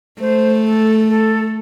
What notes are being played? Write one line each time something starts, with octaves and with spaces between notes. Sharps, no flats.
A3 C5
A4
A4